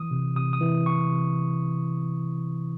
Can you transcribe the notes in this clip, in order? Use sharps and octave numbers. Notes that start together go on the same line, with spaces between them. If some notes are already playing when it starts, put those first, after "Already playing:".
Already playing: E3 D#6
C3
C3 D#6
D#6
E3
E3 C#6
C3